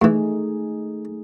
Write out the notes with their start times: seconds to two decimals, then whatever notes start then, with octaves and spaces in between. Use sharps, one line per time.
0.02 A2 E3 A3 D#4 G#4